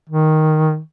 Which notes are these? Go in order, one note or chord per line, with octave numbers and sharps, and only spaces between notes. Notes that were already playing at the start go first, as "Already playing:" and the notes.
D#3